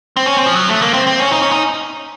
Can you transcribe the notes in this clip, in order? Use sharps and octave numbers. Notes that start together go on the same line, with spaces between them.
C4
C#4
C4
F3
F#3
A3
A#3
C4
C4
C#4
D#4
C#4
D#4